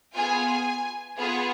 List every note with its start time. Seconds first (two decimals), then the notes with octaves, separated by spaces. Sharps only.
0.14 B3 F4 G#4 G#5
1.18 B3 F4 G#4